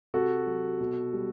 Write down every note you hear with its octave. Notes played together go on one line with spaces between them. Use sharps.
C3 F#4 A4
F#3
B2
G3